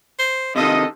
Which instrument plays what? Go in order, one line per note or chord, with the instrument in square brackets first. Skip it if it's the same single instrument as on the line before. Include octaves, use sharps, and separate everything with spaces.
[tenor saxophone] C5
[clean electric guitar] C3 D#3 [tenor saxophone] F4 [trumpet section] A4 D#5